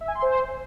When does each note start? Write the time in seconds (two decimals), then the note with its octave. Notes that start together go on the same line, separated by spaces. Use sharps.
0.01 E5
0.08 G#5
0.15 C6
0.22 C5